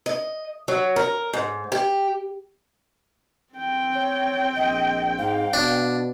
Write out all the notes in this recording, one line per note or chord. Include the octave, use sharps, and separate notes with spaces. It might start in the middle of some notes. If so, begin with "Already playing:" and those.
D#5
F#3
A#4
G#2
G4
C4 G5
C#5
A#1 D#5
G#2 F5
B2 D4